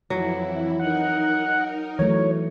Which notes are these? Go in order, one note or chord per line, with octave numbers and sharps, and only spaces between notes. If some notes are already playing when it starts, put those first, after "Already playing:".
F2 E3 F#3 E4
D#4 A#4 F#5
E3 F#3 A3 C#5